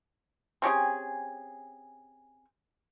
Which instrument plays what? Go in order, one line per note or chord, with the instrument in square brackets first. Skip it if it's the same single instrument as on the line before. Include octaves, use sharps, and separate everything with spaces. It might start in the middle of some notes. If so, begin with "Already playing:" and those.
[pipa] C4 C#4 G4 G#4